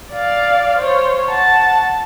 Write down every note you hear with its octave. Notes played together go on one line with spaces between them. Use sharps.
D5 F5
C5 C#5
F#5 A5